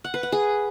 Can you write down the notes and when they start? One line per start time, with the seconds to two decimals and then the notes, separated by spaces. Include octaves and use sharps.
0.04 F#5
0.14 B4
0.23 F#5
0.32 G#4